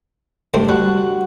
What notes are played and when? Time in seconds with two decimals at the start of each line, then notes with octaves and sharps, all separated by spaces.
0.54 C#2 G2 A3 C4
0.69 G3 F#4 F#6